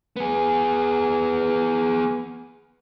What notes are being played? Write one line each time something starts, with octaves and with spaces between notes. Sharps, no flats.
B3 G#4